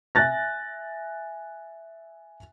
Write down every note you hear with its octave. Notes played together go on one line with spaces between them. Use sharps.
E5 G#5 F#6 A6 A#6